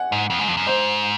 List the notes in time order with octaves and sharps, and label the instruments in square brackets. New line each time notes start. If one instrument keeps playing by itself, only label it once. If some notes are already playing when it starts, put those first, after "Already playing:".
Already playing: [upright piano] F#5 G#5
[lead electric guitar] G#2
F2
G#2
F2
F#2
[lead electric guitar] G#2 [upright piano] C5